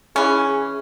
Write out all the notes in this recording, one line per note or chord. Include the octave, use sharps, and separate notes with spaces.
E3 C#4 G#4